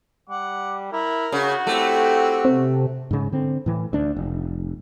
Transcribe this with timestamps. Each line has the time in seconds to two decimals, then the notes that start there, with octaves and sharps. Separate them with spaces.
0.29 G3 F#5 D6
0.92 E4 A#4
1.32 C#3 F#4
1.67 A3 C4 E4 G4
2.45 C3
3.11 G#2 C#3
3.32 D3 C4
3.66 A2 E3
3.93 D2 D4
4.16 F1